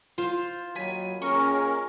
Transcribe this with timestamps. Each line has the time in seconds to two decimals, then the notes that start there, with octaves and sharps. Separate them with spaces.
0.18 F4 C5
0.75 D#2 D#3 F#3 G#5 B5
1.22 D#3 A#3 C#4 G#4 A#4 C#6